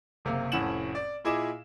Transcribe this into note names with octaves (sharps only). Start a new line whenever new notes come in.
F#1 C3 A#3 F5
F1 A2 C#4 F#5 E7 F#7
D5
A#2 E4 G#4 D#5 D6 E7